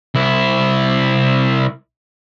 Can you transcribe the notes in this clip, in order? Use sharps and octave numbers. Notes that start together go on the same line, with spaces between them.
C2 E4